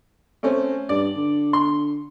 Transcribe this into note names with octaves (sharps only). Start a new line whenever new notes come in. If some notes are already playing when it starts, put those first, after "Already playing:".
A3 C4 C#4
G2 D5
D3
C6